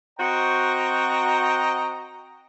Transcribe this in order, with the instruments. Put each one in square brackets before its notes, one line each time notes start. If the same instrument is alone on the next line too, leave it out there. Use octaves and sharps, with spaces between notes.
[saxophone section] C4 F#4 [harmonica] D#5 G5 A#5